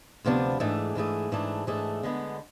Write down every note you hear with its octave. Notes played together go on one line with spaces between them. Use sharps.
D2 C3 F3 B3 D4
G#2 E3 A3 D4 G#4
G#2 E3 A3 D4 G#4
G#2 E3 A3 D4 G#4
G#2 E3 A3 D4 G#4
D3 G#3 B3